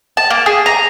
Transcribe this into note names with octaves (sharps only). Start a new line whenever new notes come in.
A5
A#3
G#4
A#5